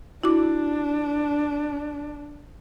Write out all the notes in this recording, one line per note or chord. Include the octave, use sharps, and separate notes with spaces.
D4 E4 F#4 D6